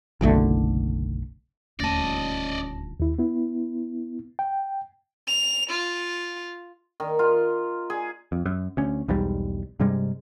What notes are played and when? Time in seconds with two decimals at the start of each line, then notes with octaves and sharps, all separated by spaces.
0.21 F#1 B1 D3 A3
1.80 D#1 D2 C#4 D5 D#5 A5 A#6
3.00 D#2 E4
3.19 B3 E4
4.39 G5
5.27 F7
5.70 F4
7.00 D#3
7.19 F4
7.90 G#4
8.32 F2
8.46 F#2
8.77 D2 C#4
9.08 B1 E2 G#2 G3
9.80 G2 C3 G3 G#3